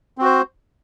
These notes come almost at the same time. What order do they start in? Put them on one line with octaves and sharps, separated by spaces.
C4 F#4 C5